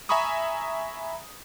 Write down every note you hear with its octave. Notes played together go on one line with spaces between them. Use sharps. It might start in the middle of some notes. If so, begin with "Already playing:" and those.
E5 G#5 A#5 B5 C#6 D#6